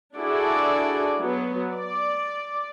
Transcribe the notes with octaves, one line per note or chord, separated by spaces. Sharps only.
D4 E4 F#4 G#4 A4 D5
F#3 B3
D5